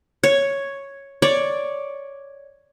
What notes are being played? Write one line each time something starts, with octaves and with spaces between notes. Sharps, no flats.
C#5
C#5 D5